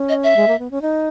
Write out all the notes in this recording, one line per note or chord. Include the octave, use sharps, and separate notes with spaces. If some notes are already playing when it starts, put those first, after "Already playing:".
Already playing: C#4
D#5
E5
G#3
A#3
B3
C#4
D#4